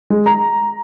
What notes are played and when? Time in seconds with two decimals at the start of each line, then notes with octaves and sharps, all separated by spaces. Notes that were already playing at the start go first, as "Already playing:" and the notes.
0.10 G#3
0.26 A#5